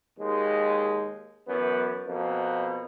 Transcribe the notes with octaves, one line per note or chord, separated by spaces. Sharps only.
D#2 G#3
F#2 E3 B3
F2 B2 A#3